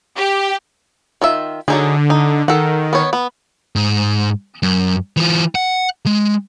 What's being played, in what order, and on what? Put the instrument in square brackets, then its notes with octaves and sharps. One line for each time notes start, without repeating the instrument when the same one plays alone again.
[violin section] G4
[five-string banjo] D#3 F4 E5
[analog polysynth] D3 [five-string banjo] F#3 D#4 G#4
[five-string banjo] D#4
[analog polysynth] D#3 [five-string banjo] A4 F#5
[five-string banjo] B3 C#5
B3
[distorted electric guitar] G#2
F#2
E3 F4
F#5
G#3